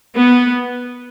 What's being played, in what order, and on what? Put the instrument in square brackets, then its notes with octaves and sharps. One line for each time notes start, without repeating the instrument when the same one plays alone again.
[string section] B3